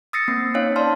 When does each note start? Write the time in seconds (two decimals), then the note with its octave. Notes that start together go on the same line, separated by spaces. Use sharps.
0.13 D#6 E6 A6 A#6 C7 C#7
0.28 A#3 C4 C7
0.54 C4 C#4 D#4 C#5 F5
0.76 D5 A5 C6 F6